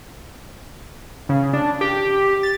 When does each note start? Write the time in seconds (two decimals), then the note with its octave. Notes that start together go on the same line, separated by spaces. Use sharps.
1.29 C#3
1.53 D4
1.81 G4
2.43 A6